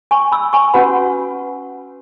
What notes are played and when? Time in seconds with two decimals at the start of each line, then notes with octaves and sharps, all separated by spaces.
0.11 G#5 C#6
0.32 B5 E6
0.53 G#5 C#6
0.74 C#4 F#4 B4 F#5 B5